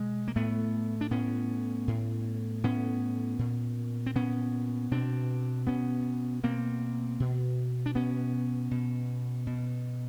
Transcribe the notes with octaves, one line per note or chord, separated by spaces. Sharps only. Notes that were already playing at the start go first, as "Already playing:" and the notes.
Already playing: B2 G#3
A#3
A2 A3 B3
D4
A2 B3 C#4
A2
A2 B3 C#4
A#2
C4
A#2 B3 C#4
B2 C4 D4
B2 B3 C#4
B2 A#3 C4
B2
D4
B2 B3 C#4
B2
B2